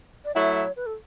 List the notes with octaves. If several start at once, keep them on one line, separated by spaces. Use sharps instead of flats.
D5
F#3 A3 E4 C#5
B4
A4